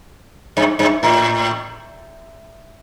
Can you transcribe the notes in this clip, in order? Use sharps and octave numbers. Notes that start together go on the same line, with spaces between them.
G2
G2
A2